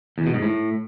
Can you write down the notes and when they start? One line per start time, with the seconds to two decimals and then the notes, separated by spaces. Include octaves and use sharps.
0.18 E2
0.26 B2
0.34 G#2
0.43 A2